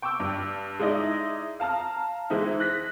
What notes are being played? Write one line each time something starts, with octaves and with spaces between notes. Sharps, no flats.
G5 C#6 D6 E6
G2
G#3 D#4 E4 D5 D#5
F5 A5 A#5 F6
E3 G#3 C4 D#4 E4
F#6 A#6 B6